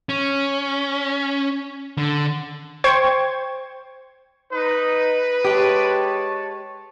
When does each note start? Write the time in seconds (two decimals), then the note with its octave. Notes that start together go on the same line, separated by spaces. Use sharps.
0.09 C#4
1.98 D3
2.84 C5 G5 C#6 G#6
4.53 D#4 B4
5.44 G#3 G4 C#5 A5